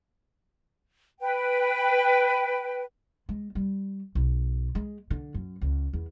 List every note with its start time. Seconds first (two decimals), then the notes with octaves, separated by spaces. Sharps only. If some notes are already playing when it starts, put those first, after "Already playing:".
1.21 B4 G5
3.29 G#3
3.55 G3
4.15 B1
4.75 G#3
5.10 D3
5.34 F#2
5.61 C#2
5.93 E2